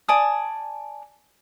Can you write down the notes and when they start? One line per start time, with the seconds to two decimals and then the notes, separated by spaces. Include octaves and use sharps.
0.08 D5 G#5 A5 D#6